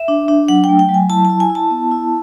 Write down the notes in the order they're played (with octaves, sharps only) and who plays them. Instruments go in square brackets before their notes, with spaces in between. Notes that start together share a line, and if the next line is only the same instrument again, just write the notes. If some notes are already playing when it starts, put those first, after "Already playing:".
Already playing: [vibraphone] E5
D4
D4
F#3 F#5
G5
A3
G5
F#3
G#5
E4 A5
E4 A5
G#5
E4
A5
B3
E4